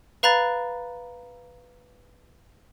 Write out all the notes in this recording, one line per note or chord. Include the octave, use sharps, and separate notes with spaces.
B4 F5 A#5 B5 F#6 A6